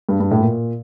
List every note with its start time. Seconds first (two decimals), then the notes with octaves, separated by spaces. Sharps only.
0.09 G2
0.20 G2
0.31 A2
0.40 A#2